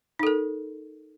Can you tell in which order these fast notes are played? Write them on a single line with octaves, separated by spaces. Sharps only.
D#4 A4 A#4